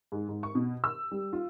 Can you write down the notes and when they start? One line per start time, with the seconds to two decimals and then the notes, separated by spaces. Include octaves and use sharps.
0.12 G#2
0.29 G#2
0.43 C#6
0.55 B2
0.84 E6
1.11 G3
1.33 F4